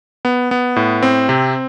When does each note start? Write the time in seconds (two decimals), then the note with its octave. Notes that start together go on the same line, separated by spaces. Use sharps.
0.25 B3
0.51 B3
0.76 A2
1.02 C4
1.29 C3